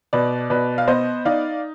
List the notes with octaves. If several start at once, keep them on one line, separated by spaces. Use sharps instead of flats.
B2 B4 D5
B2 B4 D5
F5
B3 C5 D#5
D#4 D5 F5